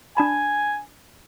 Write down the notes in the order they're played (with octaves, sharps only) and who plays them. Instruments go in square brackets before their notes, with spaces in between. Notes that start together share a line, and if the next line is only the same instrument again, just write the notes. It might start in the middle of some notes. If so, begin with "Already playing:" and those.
[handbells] D4 A5 B5 [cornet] G#5